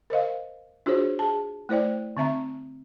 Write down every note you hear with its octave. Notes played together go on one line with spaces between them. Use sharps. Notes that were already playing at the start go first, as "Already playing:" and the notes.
A#4 C5 D#5 F5
D4 F4 F#4 G#4 C5 C#5
G#4 A5
A3 E4 C5 D5 G5
D3 C4 E5 A#5